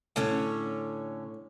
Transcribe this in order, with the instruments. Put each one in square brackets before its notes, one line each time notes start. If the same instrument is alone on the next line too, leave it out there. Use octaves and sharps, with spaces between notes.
[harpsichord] A2 [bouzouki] D3 C#4 C#5